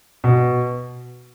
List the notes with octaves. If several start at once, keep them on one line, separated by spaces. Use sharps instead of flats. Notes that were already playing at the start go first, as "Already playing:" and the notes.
B2